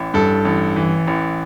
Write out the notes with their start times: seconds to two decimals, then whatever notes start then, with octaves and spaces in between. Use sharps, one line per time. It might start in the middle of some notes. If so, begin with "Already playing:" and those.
Already playing: A1 E3
0.14 G2 A4
0.45 A1
0.76 E3
1.07 A1